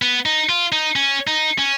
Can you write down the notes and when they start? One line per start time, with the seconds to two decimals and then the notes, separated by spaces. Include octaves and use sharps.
0.02 B3
0.26 D#4
0.49 F4
0.72 D#4
0.96 C#4
1.27 D#4
1.58 C#4